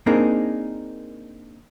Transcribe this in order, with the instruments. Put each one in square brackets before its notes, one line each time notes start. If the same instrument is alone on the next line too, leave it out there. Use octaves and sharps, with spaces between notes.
[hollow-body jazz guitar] A#3 C4 D4 D#4 G#4 A#4